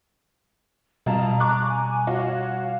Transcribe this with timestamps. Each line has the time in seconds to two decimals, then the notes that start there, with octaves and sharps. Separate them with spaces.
1.06 F2 B2 G3 F4 A5 A#5
1.40 C#6 D6 F#6
1.68 G#5
2.07 F4 F#4 C#5 F#5
2.61 F5